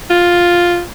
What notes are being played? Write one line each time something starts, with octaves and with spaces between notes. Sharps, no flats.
F4